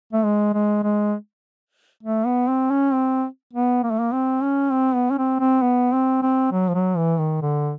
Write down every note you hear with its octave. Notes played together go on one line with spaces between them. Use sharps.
A3
G#3
G#3
G#3
A3
B3
C4
C#4
C4
B3
A#3
A3
A#3
C4
C#4
C4
B3
C#4
C4
C4
B3
C4
C4
F#3
F3
F#3
E3
D#3
D3